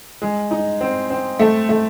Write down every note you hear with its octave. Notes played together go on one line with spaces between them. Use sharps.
G#3
D#4
C4
C4
A3
A3